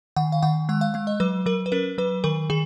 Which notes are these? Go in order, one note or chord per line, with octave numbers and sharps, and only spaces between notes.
D#3 F#5
F5
D#3 F#5
G#3 F#5
F5
G#3 F5
D#5
F#3 B4
F#3 A#4
B4
C#4 A#4
F#3 B4
D#3 A#4
D#3 G#4